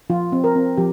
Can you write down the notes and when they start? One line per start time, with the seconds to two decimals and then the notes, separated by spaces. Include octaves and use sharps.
0.10 F3 F4
0.32 C4
0.44 A#4
0.55 C4
0.77 F3 G4